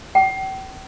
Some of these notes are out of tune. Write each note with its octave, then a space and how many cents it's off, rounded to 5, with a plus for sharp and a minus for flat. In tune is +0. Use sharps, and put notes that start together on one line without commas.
G5 -40